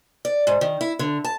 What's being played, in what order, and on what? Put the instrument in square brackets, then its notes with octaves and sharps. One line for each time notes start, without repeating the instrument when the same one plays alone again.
[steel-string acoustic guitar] D5
G#2
D#3
E4
D3
A5